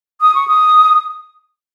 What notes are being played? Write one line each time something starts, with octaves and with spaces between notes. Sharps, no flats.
D#6
C#6
D#6